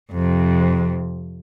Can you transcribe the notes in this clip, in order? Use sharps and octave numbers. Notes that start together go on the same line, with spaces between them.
F2 C3